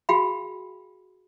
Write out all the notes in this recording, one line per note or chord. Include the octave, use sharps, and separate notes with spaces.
F#4 G#4 F5 G5 B5